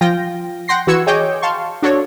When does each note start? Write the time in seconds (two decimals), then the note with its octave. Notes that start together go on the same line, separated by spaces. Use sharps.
0.01 F3 F4 G5 A#6
0.68 F#5 G5 C6 A#6 C7
0.87 E3 F#4 E6 G#6 C#7
1.07 G#4 C#5 D#5 G5 D6 G6
1.42 F5 A5 C6 C#6
1.82 D4 F#4 A4 C#5